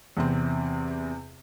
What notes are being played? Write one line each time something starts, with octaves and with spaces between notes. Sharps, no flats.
E2 C3 C4